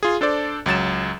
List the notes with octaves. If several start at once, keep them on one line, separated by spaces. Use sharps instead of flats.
F4 G#4
D4 A4 C5 D5
C#2 F#3 A6 E7